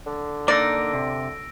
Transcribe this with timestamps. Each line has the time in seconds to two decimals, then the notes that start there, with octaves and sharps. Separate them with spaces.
0.06 D3
0.48 A#3 D4 D#4 D5 E6 A#6 D7
0.93 C3